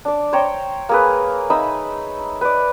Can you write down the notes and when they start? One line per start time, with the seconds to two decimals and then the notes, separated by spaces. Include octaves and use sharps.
0.05 D4 D5
0.33 C5 C#5 G5 A#5
0.89 A#3 G#4 B4
1.50 D#4 E5 B5 D#6
2.41 B4 D5